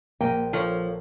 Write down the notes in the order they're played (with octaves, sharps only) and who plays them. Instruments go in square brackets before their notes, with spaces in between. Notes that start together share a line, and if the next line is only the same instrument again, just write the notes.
[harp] A#1 A#4 D#7 [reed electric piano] A#3 [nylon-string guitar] G5
[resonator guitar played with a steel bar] F3 [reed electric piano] A4 C#5